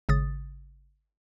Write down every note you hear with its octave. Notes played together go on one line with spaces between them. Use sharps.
G#1 C#3 D#6 A6